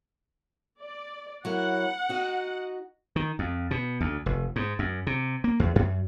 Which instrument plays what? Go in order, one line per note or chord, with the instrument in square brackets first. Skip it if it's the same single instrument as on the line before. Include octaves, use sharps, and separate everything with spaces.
[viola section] D5
[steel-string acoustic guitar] F#3 E4 A#4 [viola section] F#5
[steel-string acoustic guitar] D#4 F#4 D#5
[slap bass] D#3
F2
B2
D2
F1
G#2
F#2
C3
A#3
E2
F#2